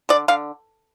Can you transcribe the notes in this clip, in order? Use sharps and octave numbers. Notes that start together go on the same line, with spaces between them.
D3 D5
D3 F5